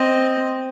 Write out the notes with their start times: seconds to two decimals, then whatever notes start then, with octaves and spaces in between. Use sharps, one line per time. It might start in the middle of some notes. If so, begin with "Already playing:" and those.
Already playing: C4 D#5